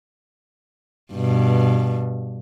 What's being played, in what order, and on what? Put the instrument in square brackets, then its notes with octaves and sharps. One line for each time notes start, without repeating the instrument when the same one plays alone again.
[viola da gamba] G2 B2